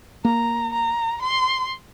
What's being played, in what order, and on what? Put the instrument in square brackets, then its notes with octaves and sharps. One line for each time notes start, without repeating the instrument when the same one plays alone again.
[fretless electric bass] A#3 [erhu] A#5
[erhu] A#5
C6